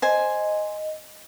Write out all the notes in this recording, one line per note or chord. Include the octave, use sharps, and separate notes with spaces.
C5 D#5 G#5